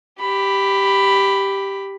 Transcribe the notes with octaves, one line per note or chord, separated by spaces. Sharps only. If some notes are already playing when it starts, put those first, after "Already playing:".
G4 B5